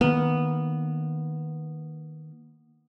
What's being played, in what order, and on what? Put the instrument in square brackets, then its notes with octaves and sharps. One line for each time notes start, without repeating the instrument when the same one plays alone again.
[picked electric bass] D#3 A#3 [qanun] B3